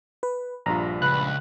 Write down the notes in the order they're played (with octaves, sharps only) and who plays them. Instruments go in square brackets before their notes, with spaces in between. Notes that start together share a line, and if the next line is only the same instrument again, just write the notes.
[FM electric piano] B4
[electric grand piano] A#1 G2 F4 [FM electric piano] A#5
[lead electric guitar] C#2 [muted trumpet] B4 [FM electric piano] F#6